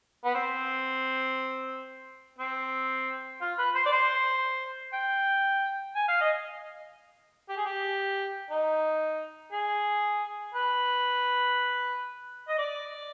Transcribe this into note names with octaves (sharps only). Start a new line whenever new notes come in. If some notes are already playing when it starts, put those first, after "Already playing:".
B3
C4
C4
F4
B4
C5
D5
C5
G5
G#5
F5
D#5
G4
G#4
G4
D#4
G#4
B4
D#5
D5